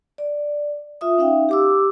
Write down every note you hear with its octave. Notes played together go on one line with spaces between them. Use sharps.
D5
F4 E5 D#6
C#4 D#4 E5 F5 G5
G4 D6 E6